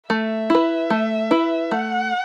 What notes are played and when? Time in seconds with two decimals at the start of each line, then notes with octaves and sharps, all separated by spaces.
0.09 A3 E5
0.50 E4 B4
0.90 A3
1.31 E4 B4
1.71 A3 F#5